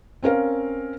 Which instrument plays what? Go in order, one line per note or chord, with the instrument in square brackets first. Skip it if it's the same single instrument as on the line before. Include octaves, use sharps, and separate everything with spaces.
[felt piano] C4 C#4 A#4 F5